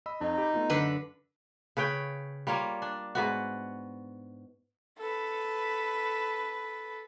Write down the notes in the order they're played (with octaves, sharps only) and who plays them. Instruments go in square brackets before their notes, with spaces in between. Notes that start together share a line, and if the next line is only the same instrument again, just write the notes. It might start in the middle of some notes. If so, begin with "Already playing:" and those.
[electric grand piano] D#5 B5 E6
[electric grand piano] F2 [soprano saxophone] D#4
[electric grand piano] G4 B5
A3 B3 F4
[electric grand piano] F#2 [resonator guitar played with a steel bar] D3 B4
[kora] C#3 B4 C#5 G5
G3 A#3 F4 C#5
D4
G#2 B3 F#4
[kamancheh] A4 B4